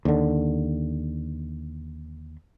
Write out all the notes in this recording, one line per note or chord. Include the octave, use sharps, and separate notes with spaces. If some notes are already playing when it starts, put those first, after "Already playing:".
D#2 D3